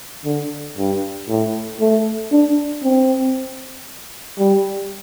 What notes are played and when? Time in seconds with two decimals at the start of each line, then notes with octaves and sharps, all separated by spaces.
0.25 D3
0.77 G2
1.28 A2
1.81 A3
2.32 D4
2.84 C4
4.39 G3